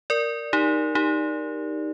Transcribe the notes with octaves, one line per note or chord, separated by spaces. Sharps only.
A#4 D5
D#4 G4
D#4 G4